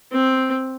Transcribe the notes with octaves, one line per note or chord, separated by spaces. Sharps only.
C4